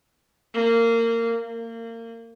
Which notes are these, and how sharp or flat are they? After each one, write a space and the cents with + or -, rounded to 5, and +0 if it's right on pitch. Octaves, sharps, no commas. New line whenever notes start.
A#3 -20
A#3 -30